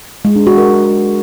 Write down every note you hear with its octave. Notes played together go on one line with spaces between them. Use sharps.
G#3
D4
F#4
A#4